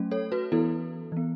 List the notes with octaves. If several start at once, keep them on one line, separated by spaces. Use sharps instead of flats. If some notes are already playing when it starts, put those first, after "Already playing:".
Already playing: F#3 A3 C#4
A4 C#5
F#4 B4
E3 B3 E4 A4
E3 B3